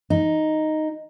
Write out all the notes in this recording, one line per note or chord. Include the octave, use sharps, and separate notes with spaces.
D#4